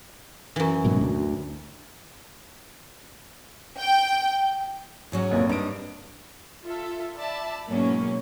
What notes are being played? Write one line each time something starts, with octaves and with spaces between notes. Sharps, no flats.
F#2 E3
G#2 B2 F#3
D2
G5
G#2 F#3 C#4
F1 A#1 D#2
G2 D#4 D#5 D7
F4 A4 E5
D5 E5 A5 B5
G#2 B2 F#3 A#3 C#4